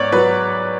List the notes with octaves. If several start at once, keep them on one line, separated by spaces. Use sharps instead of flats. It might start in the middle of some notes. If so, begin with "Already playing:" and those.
Already playing: G#2 B3 C#5 D5
F#3 B4